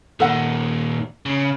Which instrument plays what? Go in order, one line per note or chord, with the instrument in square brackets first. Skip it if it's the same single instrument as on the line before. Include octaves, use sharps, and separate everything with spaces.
[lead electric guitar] A#2 D#3 [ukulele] A4 F#5
[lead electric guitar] C#3